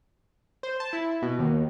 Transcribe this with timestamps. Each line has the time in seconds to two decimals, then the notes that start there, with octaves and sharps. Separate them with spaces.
0.63 C5
0.80 A5
0.93 E4
1.22 B2
1.39 D#2